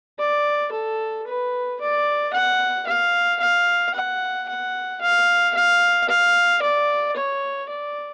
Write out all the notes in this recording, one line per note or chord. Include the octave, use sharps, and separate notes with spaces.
D5
A4
B4
D5
F#5
F5
F5
F#5
F#5
F5
F5
F5
D5
C#5
D5